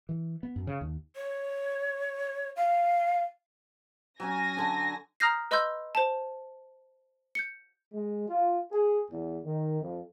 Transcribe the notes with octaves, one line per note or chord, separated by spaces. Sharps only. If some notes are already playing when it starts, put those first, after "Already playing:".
E3
B3
F#2
C#3
D#2
C#5
F5
F#3 C#4 G#5 A#6
D3 D4
A#5 D#6 F6 G6 A#6 C7
B4 D#5 B5 C6 E6 G6
C5 A5
G6 C#7
G#3
F4
G#4
E2
D#3
F2